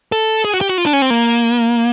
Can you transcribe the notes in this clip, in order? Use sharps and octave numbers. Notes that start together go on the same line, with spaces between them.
A4
G#4
F#4
G4
F#4
F4
D4
C#4
C4
A#3